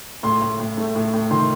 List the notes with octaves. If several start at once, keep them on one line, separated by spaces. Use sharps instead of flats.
A2 C6
A2
A2
A3
A2
A2
D#3 C6